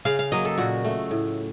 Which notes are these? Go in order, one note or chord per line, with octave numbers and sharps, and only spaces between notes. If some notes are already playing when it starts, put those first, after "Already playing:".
C#3 F5
F5
F#3 A#3 D#5
A4
A#2 F#4
A3
A2